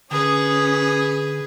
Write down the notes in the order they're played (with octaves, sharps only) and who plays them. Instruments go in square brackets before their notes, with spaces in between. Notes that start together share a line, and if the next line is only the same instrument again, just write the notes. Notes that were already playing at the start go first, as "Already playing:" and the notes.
[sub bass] D3 [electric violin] C#4 [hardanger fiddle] G#4 B4 [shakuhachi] D#6